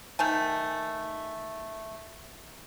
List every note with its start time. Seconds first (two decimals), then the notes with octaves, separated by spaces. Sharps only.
0.19 D#3 A3 G#5